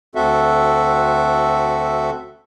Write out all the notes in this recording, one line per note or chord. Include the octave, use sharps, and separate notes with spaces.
D2 C4 F#4 A4 E5